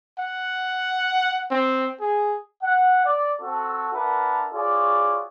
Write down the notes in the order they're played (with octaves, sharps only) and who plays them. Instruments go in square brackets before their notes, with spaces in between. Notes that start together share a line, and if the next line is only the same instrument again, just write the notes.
[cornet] F#5
C4
G#4
[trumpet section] F#5
D5
C4 F#4 A4
D4 A#4 B4 E5 F#5 A5
F4 F#4 G#4 C#5 D5